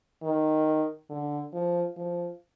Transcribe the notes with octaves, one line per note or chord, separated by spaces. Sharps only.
D#3
D3
F3
F3